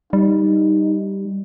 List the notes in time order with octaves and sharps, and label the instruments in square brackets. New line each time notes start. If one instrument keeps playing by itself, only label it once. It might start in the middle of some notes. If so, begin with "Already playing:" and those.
[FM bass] G3 [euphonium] D#4